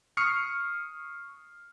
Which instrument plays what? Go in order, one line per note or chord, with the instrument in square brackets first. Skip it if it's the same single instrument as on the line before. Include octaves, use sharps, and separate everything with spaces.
[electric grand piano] C#6 D#6 F6 C7 C#7